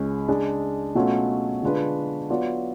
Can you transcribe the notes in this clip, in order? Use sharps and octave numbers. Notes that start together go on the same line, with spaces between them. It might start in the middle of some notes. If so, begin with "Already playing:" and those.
Already playing: C#2 C#3 G#3 C#4
C#3 G#3 D4 G#4
B2 F#3 A3 C#4 F4
D3 G#3 D4 F4 B4
F#3 B3 F4 B4 D5